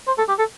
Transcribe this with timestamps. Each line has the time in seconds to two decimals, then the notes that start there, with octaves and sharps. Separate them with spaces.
0.08 C5
0.18 A4
0.29 G4
0.39 A4